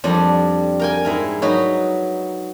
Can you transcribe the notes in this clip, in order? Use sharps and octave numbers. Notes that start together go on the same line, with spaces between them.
F2 G3 D4
A#4 G5 G#5
G#2 E4 A#4
F#3 D#4 B4